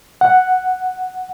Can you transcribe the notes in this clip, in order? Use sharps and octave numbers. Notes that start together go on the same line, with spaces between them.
F#5